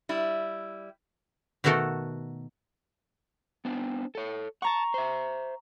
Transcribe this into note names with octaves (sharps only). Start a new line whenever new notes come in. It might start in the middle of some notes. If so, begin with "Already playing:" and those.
G3 E4
B2 D#3 A3 F#4 A4 A#4
B3 C4 D4
A4 C#5
F#5 A5 A#5 C#6
C5 E5